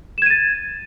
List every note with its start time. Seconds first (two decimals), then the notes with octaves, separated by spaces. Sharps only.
0.18 E7
0.22 G#6
0.26 D#7
0.30 A6